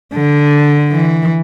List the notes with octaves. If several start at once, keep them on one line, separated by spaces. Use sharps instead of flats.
D3
E3